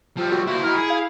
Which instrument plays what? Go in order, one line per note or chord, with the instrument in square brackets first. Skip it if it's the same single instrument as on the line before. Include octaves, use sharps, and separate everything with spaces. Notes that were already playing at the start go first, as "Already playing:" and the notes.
[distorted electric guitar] F3 G3 [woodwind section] G4 A4 C5
[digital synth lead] F#4
[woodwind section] D3 G3 A#3 [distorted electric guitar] E4 C5
[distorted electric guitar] D#4 A#4 [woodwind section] E4
[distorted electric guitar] G#4
[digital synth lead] F5